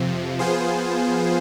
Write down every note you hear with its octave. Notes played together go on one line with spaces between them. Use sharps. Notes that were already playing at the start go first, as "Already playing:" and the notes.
Already playing: F2 C3 F3
F3 B3 F4 G#4 C5